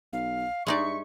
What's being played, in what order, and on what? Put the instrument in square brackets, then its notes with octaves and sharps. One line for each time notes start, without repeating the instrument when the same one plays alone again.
[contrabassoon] B1 [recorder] F5
[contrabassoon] G2 [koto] G#3 D#4 D5 [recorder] E5 [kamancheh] C#6